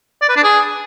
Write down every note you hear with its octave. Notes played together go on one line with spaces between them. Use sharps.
D5
B4
D4
G#4